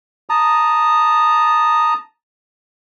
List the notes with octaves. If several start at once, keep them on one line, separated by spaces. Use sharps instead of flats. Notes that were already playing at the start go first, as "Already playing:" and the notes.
A5 A#5 D#6